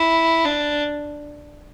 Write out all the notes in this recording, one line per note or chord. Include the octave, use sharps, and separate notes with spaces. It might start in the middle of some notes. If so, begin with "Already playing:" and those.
Already playing: E4
D4